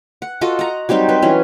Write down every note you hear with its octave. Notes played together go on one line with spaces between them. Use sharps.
F#5
F4 F#4 A4 D#5
F#5 A#5
F#3 G3 C4 D#4
C4 B4
E3 F#3 C#4